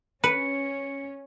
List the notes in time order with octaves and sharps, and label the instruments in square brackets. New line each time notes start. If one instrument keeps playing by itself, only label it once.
[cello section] C#4 [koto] B4 [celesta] C#7